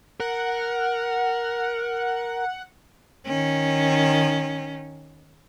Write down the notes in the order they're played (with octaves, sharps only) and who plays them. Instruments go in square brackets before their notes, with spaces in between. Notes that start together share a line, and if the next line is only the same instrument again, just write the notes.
[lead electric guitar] A#4 [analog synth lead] F#5
[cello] D#3 C#4